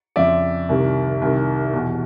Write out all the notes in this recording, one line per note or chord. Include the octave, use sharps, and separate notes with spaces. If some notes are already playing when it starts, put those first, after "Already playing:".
F2 C#3 F3 D5 E5
C2 C3 D#3
C2 C3 D#3
E2 B2